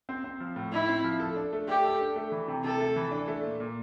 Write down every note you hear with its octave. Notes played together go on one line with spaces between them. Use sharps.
C4
C4
F3
A2
A2 E4
C4
F3
A4
D4
A3
A3 G4
A4
D4
A3
E3
C3
C3 A4
A3
E3
D4
A3
A#2
A#2